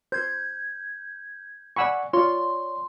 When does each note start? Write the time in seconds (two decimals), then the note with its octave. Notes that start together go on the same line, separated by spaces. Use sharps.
0.12 C5 G6 G#6
1.76 D5 F#5 G#5 B5 C#6 E6
2.13 F4 C#5 D5 C6